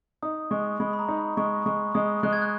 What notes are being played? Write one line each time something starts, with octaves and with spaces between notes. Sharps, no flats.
D#4 D#6
G#3 C#6
G#3 B5
B5
A#5
D#4
B5
G#3 C#6
G#3 C#6
G#3 D#6
G#3 F#6
G#6
F#6